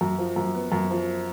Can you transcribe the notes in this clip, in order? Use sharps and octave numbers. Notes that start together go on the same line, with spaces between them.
F#2
F3
F#2
B3
F#2
F3